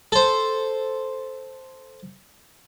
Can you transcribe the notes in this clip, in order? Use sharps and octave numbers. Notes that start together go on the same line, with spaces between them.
A4 C5